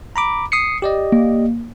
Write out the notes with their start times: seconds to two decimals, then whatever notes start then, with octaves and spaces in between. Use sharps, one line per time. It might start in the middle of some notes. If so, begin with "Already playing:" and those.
0.16 A#5 B5 D6
0.52 D#6 C7 C#7
0.82 G4 D5 D#5
1.12 A#3